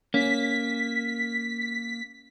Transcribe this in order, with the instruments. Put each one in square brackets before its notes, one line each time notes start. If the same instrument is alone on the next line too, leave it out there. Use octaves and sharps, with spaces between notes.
[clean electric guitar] A#3 [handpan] C#4 [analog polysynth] B6